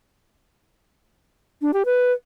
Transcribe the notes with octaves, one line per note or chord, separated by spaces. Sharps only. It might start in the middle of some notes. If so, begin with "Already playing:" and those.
D4
G4
B4